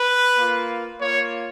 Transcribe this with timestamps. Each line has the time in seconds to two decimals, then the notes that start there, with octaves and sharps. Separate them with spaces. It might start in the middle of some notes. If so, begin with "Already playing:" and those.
Already playing: B4
0.36 A#3 F4
1.00 A#3 F4 C#5